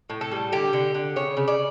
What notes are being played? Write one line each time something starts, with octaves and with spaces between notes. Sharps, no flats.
A2
A4
G3
D3 G4
D3
D3
C#3 C#5
C#3
D5